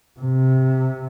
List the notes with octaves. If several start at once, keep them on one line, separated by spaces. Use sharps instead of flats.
C3